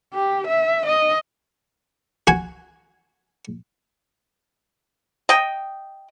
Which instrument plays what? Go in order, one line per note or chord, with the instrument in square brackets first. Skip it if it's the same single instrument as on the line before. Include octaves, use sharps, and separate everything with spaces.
[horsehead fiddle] G4
E5
D#5
[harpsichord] F#4 G#5
[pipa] D#5 G5